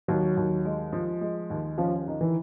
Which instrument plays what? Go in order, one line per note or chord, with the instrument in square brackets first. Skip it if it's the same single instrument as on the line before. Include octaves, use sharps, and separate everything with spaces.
[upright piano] D#2 [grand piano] F#3
[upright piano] D#2
G#3
F3
G#3
D#2
[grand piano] F3 [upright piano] C#4
[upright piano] D#3
[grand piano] E3